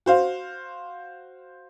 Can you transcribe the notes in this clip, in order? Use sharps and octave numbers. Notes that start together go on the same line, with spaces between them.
F#4 C5 F5